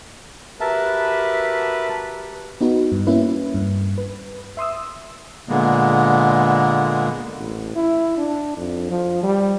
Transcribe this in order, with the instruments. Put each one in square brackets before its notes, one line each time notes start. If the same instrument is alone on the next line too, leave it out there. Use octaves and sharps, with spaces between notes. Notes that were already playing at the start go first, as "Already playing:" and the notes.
[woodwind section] F#4 G4 B4 [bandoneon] A#4 E5 A5
[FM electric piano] B3 D#4 F#4 B4
G2
A#3 C#4 E4 B4
G2
B4
E5 C6 D#6 E6
[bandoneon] A#2 D3 G#3 A#3 B3
[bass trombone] A1
E4
D4
F2
F3
G3